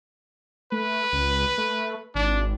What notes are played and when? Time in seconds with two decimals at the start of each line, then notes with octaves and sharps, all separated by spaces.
0.72 A3 B4
1.13 C#2
1.58 A3
2.15 G#1 D4